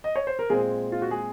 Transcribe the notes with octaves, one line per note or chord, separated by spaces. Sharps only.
D#5
C#5
C5
A#4
A#2 G#3 C4 G#4
F4
F#4
G#3 G#4